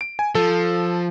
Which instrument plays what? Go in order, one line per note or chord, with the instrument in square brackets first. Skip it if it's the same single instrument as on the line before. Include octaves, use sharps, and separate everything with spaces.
[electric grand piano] D7
G#5
[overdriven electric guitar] F3 [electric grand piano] A4